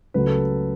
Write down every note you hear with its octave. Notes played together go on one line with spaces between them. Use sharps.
C#2 C#3 F#3 A3 B4
A4